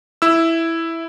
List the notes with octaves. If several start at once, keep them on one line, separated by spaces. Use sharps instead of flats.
E4 E6